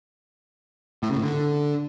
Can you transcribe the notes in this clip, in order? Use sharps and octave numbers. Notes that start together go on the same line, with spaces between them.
A2
C#3
A2
D3